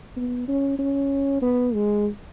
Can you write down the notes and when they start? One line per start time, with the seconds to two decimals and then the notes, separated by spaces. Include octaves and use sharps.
0.16 B3
0.48 C#4
0.78 C#4
1.42 B3
1.74 G#3